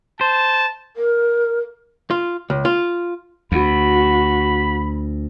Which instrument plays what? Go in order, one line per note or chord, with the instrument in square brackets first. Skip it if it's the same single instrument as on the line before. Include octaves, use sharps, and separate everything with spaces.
[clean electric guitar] C5 [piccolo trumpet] A5
[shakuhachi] A#4
[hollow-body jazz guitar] F4
C#2
F4
[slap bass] D2 [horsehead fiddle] F#4 [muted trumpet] B5